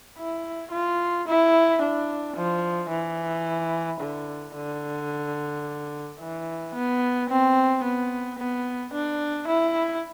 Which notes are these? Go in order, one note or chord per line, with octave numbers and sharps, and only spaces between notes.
E4
F4
E4
D4
F3
E3
D3
D3
E3
B3
C4
B3
B3
D4
E4